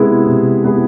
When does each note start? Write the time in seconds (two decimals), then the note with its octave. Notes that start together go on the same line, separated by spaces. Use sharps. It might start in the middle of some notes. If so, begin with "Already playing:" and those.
Already playing: C3 G#3 B3 E4 G#4
0.27 C3
0.63 G#3 B3 E4 G#4